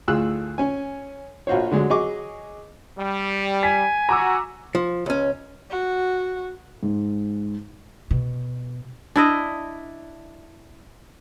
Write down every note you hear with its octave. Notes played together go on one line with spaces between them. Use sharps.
D2 A2 F4 G#4 E6 F#6
C#4 G#5
A#1 F4 F#4 C5 C#5
D3 F#3 G#3
F#3 G#4 D#5 C#6 D6
G3
G#5 B6
F#4 A#5 D6 E6
F3
C#2 C#4
F#4
G#2
B2
D4 E4 D#5